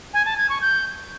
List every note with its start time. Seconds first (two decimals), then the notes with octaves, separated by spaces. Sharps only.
0.13 G#5
0.25 A5
0.37 G#6
0.49 C#6
0.61 G6